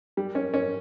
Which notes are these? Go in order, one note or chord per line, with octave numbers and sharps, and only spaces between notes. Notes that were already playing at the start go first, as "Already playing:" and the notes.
G3
C#4
C#4